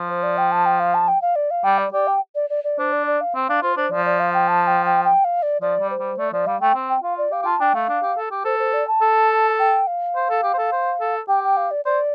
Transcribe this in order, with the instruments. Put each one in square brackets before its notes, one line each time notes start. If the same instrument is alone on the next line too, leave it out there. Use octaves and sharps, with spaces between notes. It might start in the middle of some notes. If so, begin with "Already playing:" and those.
Already playing: [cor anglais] F3
[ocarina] C5
D5
G5
A5
G5
F5
A5
G5
F5
D5
F5
[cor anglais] G3 [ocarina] G5
[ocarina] D5
[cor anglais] G4 [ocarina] D5
[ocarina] G5
D5
D5
D5
[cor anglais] D4 [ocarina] C5
[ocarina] D5
D5
F5
[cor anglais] C4
[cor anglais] D4 [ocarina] F5
[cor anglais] F4 [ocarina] C5
[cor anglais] D4 [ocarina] C5
[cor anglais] F3 [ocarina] D5
[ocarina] D5
F5
G5
A5
G5
G5
G5
F5
D5
[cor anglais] F3 [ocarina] D5
[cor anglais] G3
[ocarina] C5
[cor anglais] G3
[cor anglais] A3 [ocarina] D5
[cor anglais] F3 [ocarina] D5
[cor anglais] G3 [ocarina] F5
[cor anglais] A3 [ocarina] G5
[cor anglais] C4
[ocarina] G5
[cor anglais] F4 [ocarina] F5
[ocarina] D5
[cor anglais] G4 [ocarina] F5
[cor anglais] G4
[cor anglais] F4 [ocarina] A5
[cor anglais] D4 [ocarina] G5
[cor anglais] A3 [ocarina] F5
[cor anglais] D4
G4
A4
G4
[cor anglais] A4 [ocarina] C5
[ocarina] C5
D5
A5
[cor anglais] A4
[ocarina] G5
F5
[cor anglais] C5
A4
G4
C5
A4
C5
A4
[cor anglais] G4 [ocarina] G5
[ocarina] G5
F5
D5
[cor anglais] C5 [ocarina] D5